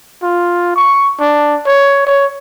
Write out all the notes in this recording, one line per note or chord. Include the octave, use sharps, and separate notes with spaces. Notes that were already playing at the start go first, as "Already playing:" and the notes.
F4
C#6
D4
C#5
C#5